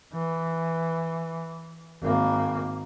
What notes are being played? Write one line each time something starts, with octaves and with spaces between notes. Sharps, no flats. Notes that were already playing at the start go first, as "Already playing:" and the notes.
E3
G#1 A#3